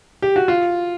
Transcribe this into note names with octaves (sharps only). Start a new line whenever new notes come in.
G4
F#4
F4